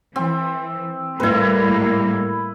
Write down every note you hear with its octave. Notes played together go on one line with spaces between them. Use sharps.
E3 C4
A2 G3 A#3 E4 B4